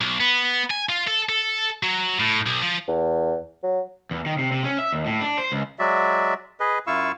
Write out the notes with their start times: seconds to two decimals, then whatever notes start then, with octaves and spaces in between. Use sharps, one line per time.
0.01 B1
0.20 B3
0.71 G#5
0.89 F4
1.07 A4
1.29 A4
1.83 F#3
2.20 A2
2.46 B1
2.62 F3
2.88 E2
3.63 F#3
4.11 E2
4.26 D#3
4.39 C3
4.52 C3
4.64 C#4
4.78 E5
4.93 D#2
5.06 A2
5.21 D4
5.38 C5
5.52 C#2
5.79 F#3 G#3 F#4 D5 E5
6.60 G#4 B4 D#5
6.87 F#2 E4 F4 F5 C#6 E6